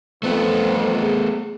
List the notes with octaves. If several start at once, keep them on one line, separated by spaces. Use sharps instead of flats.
F2 A3 B3
G#4